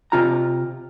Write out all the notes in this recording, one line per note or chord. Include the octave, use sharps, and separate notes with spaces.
C3 F4 A#5